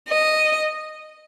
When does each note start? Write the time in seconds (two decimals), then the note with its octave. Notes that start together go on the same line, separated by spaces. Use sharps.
0.10 D#5